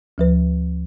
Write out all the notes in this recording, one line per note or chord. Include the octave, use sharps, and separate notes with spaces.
D2 F3 B4